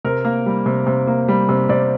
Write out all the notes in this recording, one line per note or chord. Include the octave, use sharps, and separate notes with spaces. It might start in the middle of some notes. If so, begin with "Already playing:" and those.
C3 A#4
A#3
G3
C3
C3
A#3
G3
C3
C3 D5